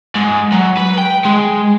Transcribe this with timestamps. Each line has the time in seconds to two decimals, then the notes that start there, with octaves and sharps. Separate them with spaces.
0.16 G#2
0.52 F#3
0.77 B4
0.98 G5
1.25 G#3